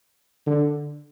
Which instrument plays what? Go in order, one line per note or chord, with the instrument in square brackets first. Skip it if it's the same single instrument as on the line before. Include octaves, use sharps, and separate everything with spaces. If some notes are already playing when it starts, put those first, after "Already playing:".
[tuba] D3